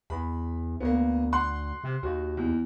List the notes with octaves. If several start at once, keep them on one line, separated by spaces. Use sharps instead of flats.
E2 B5
D2 A#3 B3
F#5 C6 F#6
C3
D#2 F#4
E2